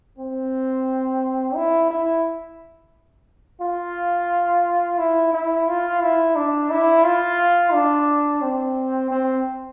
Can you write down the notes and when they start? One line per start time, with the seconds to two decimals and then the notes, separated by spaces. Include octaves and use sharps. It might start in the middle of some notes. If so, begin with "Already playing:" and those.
0.18 C4
1.55 E4
1.90 E4
3.61 F4
4.98 E4
5.33 E4
5.68 F4
6.02 E4
6.36 D4
6.70 E4
7.05 F4
7.73 D4
8.42 C4
9.11 C4